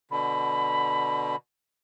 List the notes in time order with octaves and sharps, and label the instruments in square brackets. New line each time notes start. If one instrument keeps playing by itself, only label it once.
[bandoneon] B2 D3 [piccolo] B5